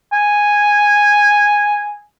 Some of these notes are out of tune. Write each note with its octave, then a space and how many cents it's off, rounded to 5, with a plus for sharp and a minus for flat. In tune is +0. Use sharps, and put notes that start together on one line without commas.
G#5 -5